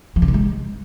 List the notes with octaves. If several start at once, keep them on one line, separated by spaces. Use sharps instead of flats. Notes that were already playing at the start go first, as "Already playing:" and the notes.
F3
C#3
E3
G#3